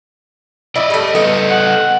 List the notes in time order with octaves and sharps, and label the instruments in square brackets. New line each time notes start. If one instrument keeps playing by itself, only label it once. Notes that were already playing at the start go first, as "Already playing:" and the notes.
[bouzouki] E4 [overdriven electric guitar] D5 D#5
[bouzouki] G3 A3
[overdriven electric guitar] B3 A4 [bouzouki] D#5
[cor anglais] F#5